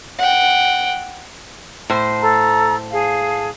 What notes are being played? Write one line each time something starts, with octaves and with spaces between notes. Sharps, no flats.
F#5 G5
A2 C5
A4 A#5
G#4 F5 A5